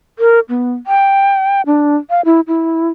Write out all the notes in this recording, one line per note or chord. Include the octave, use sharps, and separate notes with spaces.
A#4
B3
G5
D4
F5
E4
E4